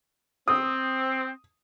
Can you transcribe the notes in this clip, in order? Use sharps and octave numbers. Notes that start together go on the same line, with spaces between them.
C4 D#6